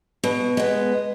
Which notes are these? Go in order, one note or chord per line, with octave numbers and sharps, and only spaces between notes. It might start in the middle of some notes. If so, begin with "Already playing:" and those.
B2
G#3 B3